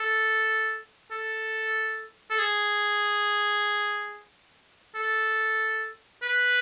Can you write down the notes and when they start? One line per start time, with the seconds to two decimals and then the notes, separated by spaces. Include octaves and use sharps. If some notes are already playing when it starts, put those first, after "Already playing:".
Already playing: A4
1.11 A4
2.30 A4
2.39 G#4
4.95 A4
6.23 B4